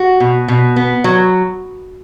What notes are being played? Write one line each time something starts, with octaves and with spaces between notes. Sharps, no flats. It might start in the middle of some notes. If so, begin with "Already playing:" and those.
Already playing: F#4
B2
B2
B3
F#3